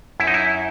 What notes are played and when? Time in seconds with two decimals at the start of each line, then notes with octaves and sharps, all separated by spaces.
0.20 F#2 E4
0.27 D#4
0.34 E4